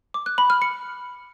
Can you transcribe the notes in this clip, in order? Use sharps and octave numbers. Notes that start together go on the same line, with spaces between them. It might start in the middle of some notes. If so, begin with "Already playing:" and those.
D6
F#6
B5
F6
C#7